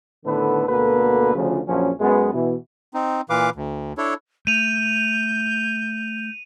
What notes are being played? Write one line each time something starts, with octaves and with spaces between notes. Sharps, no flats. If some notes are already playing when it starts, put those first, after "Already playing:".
A2 D3 D#3 B3 A4 B4
D2 B2 A#3 B3 A4 B4
D2 C#3 F3
A#1 F#2 F3 F#3 C#4
F#2 G#3 B3
B2 E3
C4 D#4
A#2 E3 B4 F5 D6
D2
D4 E4 A4 C#5
A3 G6 D#7 F7